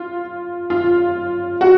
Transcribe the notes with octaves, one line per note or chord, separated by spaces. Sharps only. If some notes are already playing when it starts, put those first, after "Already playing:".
Already playing: F4
F4
F#4